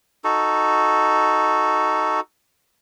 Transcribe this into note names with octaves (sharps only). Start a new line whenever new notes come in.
D#4 F#4 A4